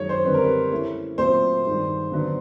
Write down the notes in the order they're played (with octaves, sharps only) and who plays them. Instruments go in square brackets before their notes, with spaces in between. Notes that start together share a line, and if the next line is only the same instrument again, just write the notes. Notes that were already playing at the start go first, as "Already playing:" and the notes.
Already playing: [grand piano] F#2 D#3 G#3 [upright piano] C#5
[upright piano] C5
[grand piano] D3 G3 C4 [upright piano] B4
[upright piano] A#4
B4
[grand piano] A3 C#4 E4 A4 C#5
[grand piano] A#2 F#3 A3 C4 [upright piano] C5
[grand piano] G2 D#3 G#3
D3 F#3 B3 D4